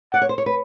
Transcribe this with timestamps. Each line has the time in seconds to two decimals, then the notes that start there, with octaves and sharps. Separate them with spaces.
0.13 D5 F#5
0.22 C#5
0.29 C5
0.38 C#5
0.46 B4